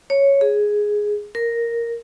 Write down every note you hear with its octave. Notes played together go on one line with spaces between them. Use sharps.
C#5
G#4
A#4